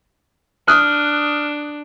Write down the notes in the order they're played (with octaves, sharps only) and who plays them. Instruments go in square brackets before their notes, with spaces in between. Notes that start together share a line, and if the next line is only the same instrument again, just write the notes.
[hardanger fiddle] D4 [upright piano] D#6 F#6 [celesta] F6